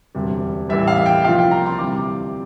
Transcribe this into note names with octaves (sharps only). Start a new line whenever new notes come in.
E1 D2 C3 G3
A1 A2 E3 G3 E5
F5
G5
C2 A#2 F3 F5
G5
A#5
C6
D2 C3 E3 G3 D6